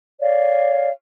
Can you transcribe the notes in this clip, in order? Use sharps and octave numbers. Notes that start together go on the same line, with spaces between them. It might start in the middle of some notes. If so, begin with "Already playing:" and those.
C#5 D5 F5